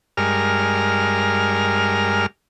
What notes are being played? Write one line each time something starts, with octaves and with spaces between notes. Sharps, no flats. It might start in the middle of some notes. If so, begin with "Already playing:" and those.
G2 G#3 A#4 F6